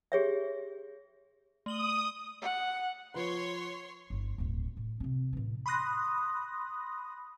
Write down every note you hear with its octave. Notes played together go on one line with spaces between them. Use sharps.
G4 G#4 C#5 E5
A3 D#6 F#7 G7
F#5
F3 B4 C#5 C6
G1 E4
D1 G1
A2
C3 C4
A2 E3
B5 C6 D#6 F#6 A#6